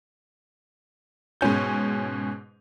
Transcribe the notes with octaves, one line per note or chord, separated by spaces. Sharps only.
G#2 B2 C#4 G6